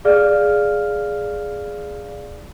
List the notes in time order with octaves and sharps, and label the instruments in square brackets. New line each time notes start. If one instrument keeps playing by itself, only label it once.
[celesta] G#4 D5 F5 F6